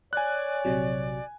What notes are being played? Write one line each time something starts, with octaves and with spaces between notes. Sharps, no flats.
C#5 D5 G#5 F#6
A#1 C3 F#3